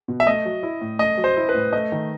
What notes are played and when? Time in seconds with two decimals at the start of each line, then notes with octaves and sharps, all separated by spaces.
0.08 B2
0.20 E5
0.26 A3 D#5
0.45 F#3
0.63 E4
0.81 A2
0.99 A3 D#5
1.18 F#3
1.24 C5
1.37 E4
1.49 B4
1.54 A2
1.73 A3 D#5
1.92 D#3